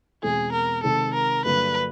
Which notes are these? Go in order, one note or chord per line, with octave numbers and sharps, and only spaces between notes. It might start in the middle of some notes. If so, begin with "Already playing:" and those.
E2 B2 G#3 C4 G#4
A#4
C3 D#3 G#3 C4 A4
A#4
G2 D3 F#3 A#3 B4